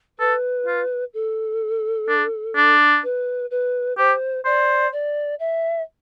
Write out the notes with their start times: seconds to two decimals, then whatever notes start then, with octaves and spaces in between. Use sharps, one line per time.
0.19 A4 B4
0.67 F4
1.14 A4
2.09 D4
2.56 D4
3.03 B4
3.51 B4
3.98 G4 C5
4.45 C5 D5
4.92 D5
5.40 E5